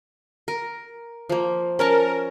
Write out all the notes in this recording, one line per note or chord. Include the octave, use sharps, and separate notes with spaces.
A#4
F3 A#3
C#4 A#4 C#5 A5